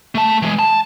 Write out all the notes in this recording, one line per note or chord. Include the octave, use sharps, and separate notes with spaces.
A3 A5
E3 G#3
A5